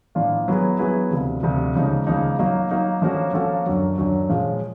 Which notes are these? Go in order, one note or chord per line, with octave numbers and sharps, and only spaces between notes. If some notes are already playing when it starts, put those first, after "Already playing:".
A2 F3 A#3 D4 F4
F#3 B3 E4 G#4 B4
F#3 B3 E4 G#4 B4
D2 C3 F3
D2 C3 F3
C#2 C#3 F3 A#3 D#4
C#2 C#3 F3 A#3 D#4
F#3 A#3 D#4
F#3 A#3 D#4
F3 A#3 C#4 F#4 A4
F3 A#3 C#4 F#4 A4
F#2 D3 F#3
F#2 D3 F#3
A#2 F3 G#3 C#4